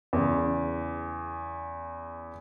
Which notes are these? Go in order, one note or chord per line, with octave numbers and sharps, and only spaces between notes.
E2 C#3